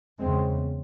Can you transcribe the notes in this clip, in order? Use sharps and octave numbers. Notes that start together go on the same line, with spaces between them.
E2 C#3 G#3 C4